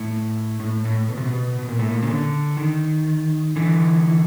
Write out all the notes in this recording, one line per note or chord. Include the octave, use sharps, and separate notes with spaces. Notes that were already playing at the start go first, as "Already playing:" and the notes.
Already playing: A2
A2
A2
B2
C3
B2
B2
A#2
A2
A#2
C#3
D3
D#3
D3 E3